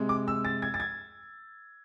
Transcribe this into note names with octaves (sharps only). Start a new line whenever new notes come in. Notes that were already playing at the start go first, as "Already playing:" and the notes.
Already playing: C3 G#3
D6
E6
A6
G#6
A6
G#6